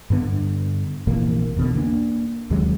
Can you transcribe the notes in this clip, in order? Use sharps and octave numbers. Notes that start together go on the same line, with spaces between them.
G2 D3 B3
A#1 C3 E3 A#3
E2 B2 D3
A#3 D4
D#2 C3 F#3 G#3